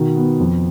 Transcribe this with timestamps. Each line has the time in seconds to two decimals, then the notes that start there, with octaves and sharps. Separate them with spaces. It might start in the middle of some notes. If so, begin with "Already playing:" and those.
Already playing: B2 D#3
0.16 B3
0.40 F2